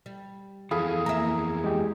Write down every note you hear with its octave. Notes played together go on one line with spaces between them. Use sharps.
G3
F2 E3 G#4 A4 F5 B5
A#3 E5 A#5
G#3 G4